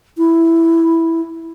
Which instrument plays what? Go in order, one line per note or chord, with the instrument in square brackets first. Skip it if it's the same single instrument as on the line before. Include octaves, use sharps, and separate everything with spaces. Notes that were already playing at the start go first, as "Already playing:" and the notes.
[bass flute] E4